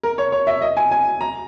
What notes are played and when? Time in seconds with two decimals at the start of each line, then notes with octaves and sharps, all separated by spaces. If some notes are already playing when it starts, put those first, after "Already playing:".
0.03 A#4
0.18 C#5
0.32 C#5
0.47 E5
0.62 D#5
0.77 G#5
0.92 G#5
1.21 A#5